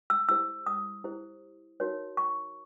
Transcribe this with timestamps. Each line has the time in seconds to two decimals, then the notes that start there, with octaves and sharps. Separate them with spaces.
0.10 E6
0.29 E4 G4 C5 E6
0.66 D#6
1.04 E4 G4 C5
1.80 D#4 F#4 A#4 C#5
2.17 C#6